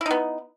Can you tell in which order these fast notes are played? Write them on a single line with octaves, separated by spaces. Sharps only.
E4 D#4 B3